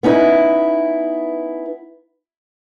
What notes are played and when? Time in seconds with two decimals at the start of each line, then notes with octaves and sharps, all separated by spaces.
0.03 B3 C#4 D#4 E4 B4